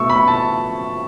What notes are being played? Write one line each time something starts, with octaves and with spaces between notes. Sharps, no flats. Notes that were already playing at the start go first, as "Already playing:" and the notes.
Already playing: B2 A3 C#6 E6
B5
A5